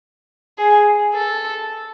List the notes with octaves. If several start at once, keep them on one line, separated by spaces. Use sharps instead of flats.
G#4
A4